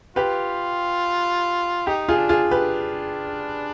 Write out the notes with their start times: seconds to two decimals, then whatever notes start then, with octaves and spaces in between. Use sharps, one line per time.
0.16 F4 G4 B4
1.87 D#4 G4
2.09 F4 G#4
2.15 D4
2.29 F4 G#4
2.44 D4
2.51 G4 B4